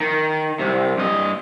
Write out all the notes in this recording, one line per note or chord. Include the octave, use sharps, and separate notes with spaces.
D#3
C2 C3
G2 D#5